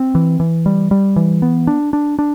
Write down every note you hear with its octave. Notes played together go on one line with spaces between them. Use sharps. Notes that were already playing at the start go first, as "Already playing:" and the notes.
Already playing: C4
E3
E3
G3
G3
E3
B3
D4
D4
D4